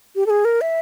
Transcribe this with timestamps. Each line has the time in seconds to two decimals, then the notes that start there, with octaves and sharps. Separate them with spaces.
0.16 G4
0.26 A4
0.30 G#4
0.45 A#4
0.61 E5